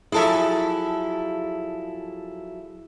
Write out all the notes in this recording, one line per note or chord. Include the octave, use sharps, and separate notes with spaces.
F3 F#3 E4 G#4 A4 E5